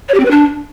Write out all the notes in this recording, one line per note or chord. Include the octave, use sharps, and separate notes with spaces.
C#5
G4
C4
B4
D4